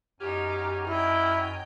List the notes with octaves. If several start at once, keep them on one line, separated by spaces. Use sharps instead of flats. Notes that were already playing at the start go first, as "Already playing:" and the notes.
F#2 D#4 G4 G#5 F6
E4 D#5 G5